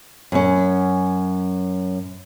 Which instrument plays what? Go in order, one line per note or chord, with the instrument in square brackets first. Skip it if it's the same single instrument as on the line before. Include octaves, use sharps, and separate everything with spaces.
[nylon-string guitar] F#2 C#4